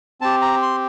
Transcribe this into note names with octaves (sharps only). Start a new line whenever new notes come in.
C4 G4 A5
A#5
C6